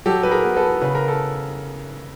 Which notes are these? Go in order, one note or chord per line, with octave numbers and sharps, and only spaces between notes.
F#3 G4 A4
B4
G#4 A#4
B3
A4 B4
C#3 B4
A#4
A4